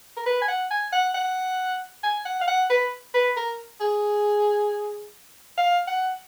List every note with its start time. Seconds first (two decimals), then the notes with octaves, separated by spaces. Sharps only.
0.17 A#4
0.26 B4
0.42 G#5
0.48 F#5
0.71 G#5
0.93 F#5
1.15 F#5
2.04 G#5
2.26 F#5
2.41 F5
2.48 F#5
2.70 B4
3.14 B4
3.37 A#4
3.81 G#4
5.58 F5
5.88 F#5